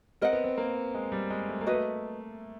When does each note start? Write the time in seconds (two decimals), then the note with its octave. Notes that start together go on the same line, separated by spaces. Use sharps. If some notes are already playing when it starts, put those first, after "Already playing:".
0.22 C4 A#4 D#5 F#5
0.33 B3
0.44 C4
0.58 A#3
0.94 G#3
1.12 G3
1.30 G#3
1.49 A3
1.61 A#3
1.66 F#4 B4 D#5
1.73 A3